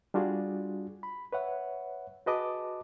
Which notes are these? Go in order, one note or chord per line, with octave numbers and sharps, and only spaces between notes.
G3 D4 F4 F#4 G#4
B5
B4 C#5 E5 F#5
F#4 G#4 B4 D#5 A5 D6